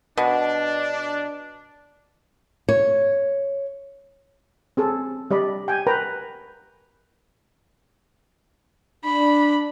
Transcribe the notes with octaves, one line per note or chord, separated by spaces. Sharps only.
B2 D4
C#5
C4 G#4 A4
G3 D5 D#5 B5
G5 G#5
A#4 B4 G5 A#5
D4 B5